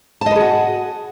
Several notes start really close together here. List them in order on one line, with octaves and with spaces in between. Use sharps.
A5 D#5 B4 G#4 F#4